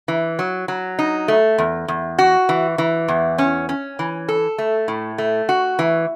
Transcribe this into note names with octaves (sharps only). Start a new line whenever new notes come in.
E3
F#3
F#3
D#4
A3
E2
E2
F#4
E3
E3
E2
C#4
C#4
E3
A4
A3
A2
A3
F#4
E3